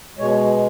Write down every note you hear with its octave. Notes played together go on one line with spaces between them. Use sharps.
B2 G#3 C#5